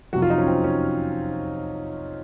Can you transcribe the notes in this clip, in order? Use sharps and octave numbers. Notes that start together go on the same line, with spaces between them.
F2 C3 F#3 F#4
F4
D#4
C#4
C4
C#4